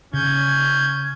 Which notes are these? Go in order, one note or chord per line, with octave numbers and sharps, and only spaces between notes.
C#3 C#4 G6 G#6